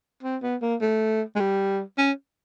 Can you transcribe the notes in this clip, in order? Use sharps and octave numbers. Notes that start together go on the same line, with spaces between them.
C4
B3
A#3
A3
G#3
G3
C#4